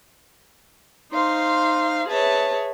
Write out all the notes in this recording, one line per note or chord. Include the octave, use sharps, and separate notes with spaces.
D#4 C5 F5 C6
G#4 B4 C#5 E5 A5